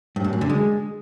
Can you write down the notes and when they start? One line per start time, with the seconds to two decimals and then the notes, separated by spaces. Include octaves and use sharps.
0.16 G2
0.24 A2
0.33 F#2
0.41 D3
0.50 G#3